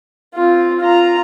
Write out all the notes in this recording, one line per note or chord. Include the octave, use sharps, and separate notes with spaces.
C4 F4
F4 A#5